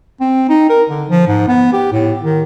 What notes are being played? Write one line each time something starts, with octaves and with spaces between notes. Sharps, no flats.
C4
D#4
A#4
D3
F3
G#2
B3
G4
A2
D#3